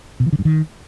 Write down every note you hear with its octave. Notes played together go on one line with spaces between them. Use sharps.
B2
E3
D3
G2
D#3